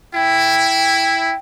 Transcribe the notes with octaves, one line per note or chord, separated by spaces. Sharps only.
E4 G5